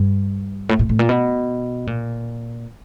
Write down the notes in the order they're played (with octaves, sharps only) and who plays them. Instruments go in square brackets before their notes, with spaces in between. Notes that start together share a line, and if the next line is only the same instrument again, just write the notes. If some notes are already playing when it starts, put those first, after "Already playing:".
Already playing: [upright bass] G2
A2
A2
A2
A#2
B2
A#2